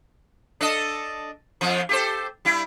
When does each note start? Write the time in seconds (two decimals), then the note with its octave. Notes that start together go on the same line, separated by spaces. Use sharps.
0.61 D4 A4 D#5
1.61 F2 F3
1.89 G4 A4 C5
2.45 G3 E4